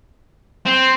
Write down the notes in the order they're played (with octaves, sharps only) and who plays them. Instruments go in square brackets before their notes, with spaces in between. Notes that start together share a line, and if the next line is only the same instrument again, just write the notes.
[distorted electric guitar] C4 [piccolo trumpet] C5